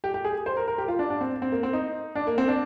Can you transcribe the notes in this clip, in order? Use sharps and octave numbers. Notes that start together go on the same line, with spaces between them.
G4
G4
G#4
C5
A#4
A#4
G4
F4
D4
D4
C4
C4
A#3
C4
D#4
D4
A#3
C4
D4